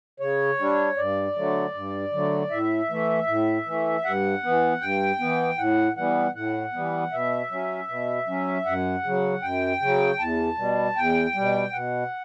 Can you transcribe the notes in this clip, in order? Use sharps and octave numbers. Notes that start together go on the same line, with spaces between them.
C#3 C#5
G3 D4
G2 D5
D3 F#3 A3
G2
D3 F#3 A3
A2 E5
E3 A3
A2
E3 A3
G2 F#5
E3 B3
G2 G5
E3 B3
A2 F#5
E3 G3 B3 F#5
A2 F#5
E3 G3 B3
B2 E5
F#3 C#4
B2
F#3 C#4
F#2 F#5
C#3 F#3
F#2 G5
C#3 F#3
E2 A5
B2 G3
E2 G5
B2 G3
B2 F#5